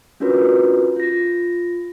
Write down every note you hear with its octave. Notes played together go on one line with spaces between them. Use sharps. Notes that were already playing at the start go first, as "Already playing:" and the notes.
C#4 D4 F4 F#4 A#4 B4
F4 A#6